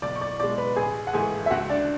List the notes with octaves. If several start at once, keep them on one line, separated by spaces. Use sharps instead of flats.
B1 D5 D6
C#6
D5 D6
B2 G#3 D5 D6
B4 B5
A1 G#4 G#5
F#5
G#2 E3 A3 G#4 G#5
E5
C#2 F#4 F#5
D4 D5